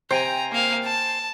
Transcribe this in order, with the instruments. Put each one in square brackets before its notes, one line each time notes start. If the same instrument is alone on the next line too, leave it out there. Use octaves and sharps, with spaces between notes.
[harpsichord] C3 [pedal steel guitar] C5 G5 G#5 [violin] A#5
[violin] A#3 F5
A5